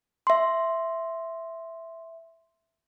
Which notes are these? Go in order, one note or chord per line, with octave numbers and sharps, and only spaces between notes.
E5 C6